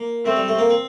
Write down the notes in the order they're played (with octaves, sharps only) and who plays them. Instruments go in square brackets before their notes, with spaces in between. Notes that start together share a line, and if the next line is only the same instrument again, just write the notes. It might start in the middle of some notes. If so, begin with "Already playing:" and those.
Already playing: [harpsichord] A#3
[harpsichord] A3 [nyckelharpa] C4
[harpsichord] G3
A3
A#3
C4